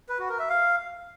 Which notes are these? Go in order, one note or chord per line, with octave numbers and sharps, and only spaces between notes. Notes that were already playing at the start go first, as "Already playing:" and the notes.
B4
F#4
A#4
E5
F5